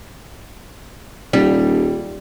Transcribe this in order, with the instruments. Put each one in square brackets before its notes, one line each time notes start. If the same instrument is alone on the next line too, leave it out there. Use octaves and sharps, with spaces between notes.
[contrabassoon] D#1 [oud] G3